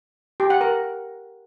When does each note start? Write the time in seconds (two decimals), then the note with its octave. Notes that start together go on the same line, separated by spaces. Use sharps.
0.40 G4
0.50 F#5
0.61 A#4